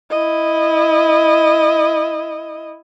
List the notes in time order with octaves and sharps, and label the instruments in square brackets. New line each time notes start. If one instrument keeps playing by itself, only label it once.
[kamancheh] E4 D#5